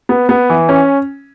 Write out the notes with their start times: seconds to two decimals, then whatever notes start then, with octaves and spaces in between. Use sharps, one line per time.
0.09 B3
0.29 B3
0.50 E3
0.69 C#4